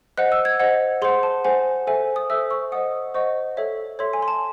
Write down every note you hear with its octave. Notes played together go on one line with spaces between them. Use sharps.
C5 D#5 F#5 F#6
E6
G#6
C5 D#5 F#5
G#4 C5 F#5 C6
A5
G#4 C5 F#5 G#5
A4 C5 E5 G#5
D#6
A4 C5 E5 E6
C#6
C5 D#5 F#5 D#6
C5 D#5 F#5 C#6
A4 C#5 E5
A4 C#5 E5 C6
G#5
C6
A5